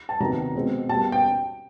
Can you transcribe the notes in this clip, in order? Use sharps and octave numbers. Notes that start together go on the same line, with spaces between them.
A5
C3 D#3 F#3 B3 A#5
B2 G#3 C4
B2 G3 A#3 A5
G5